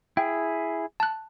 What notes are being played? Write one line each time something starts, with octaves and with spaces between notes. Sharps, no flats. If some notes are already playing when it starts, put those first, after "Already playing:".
E4 G#4 G5
A5 F#6